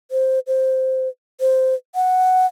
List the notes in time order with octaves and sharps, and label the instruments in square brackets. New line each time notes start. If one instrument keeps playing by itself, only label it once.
[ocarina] C5
C5
C5
F#5